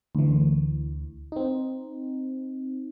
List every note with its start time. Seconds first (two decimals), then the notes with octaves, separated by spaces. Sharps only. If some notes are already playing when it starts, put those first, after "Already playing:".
0.15 D2 E3
1.32 C4 D#4